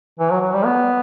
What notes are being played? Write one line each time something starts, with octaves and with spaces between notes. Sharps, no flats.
E3
F#3
F#3
G3
B3